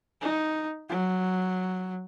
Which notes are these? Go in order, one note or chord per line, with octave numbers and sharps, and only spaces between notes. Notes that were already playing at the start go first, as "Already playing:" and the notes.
D#4
F#3